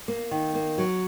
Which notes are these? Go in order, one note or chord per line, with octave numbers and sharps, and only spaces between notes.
A#3
D#3
A#3
F#3